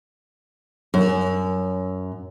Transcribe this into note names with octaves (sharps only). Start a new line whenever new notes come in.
F#2